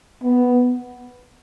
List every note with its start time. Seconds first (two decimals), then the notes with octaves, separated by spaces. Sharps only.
0.23 B3